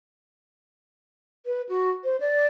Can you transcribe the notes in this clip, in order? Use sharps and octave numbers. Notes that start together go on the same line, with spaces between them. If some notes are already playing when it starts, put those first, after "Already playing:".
B4
F#4
C5
D5